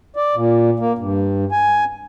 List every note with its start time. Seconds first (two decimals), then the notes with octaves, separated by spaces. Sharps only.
0.16 D5
0.35 A#2
0.79 A#3
0.98 G2
1.52 G#5